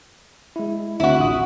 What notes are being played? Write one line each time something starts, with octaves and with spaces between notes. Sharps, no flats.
G#3 E4
D2 C4 D4 E4 F#4
A1 F4 D#6